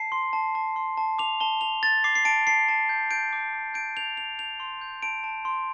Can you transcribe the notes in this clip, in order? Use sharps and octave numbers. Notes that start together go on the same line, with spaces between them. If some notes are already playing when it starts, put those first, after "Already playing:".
Already playing: A5 C7
C6
A5
A5
C6
A5
D6 F7
A5 G7
A5 F7
A5 A6
D6 C7
C7
A5 D7
A5 C7
A5
G6
G6 D7
D6
D6
G6 D7
G6 F7
G6 F7
G6 F7
C6
G6
A5 D7
A5
C6